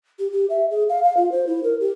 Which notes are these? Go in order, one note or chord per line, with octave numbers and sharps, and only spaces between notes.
G4
G4
E5
G#4
F5
F5
F4
C5
E4
A#4
G4